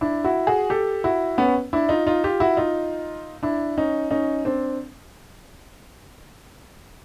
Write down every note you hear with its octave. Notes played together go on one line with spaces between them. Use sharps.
D4 E4
E4 F#4
F#4 G#4
G4 A4
E4 F#4
B3 C#4
D4 E4
D#4 F4
D#4 F4
F4 G4
E4 F#4
D#4 F4
D4 E4
C#4 D#4
C#4 D#4
C4 D4